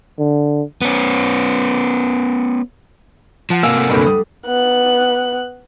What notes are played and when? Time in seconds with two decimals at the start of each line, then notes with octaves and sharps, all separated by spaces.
0.19 D3
0.82 B3 C#4
3.50 F3 F#5 A5 F6
3.63 C3 A#3 F5 G#5 E6
3.75 A3 A4 F#5
3.90 D2 G2
4.06 G3 D4 D#6
4.46 B3 F#6